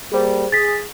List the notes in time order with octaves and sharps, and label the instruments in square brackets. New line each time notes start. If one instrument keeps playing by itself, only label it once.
[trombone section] G3 A#3 [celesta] G#4 C5
[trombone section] G#4 [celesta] A6 B6